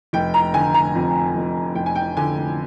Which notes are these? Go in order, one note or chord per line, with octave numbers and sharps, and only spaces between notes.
F1 G5
A#5
D3 G#5
A#5
F2
F1
F1 G5
G#5
G5
D3 G#5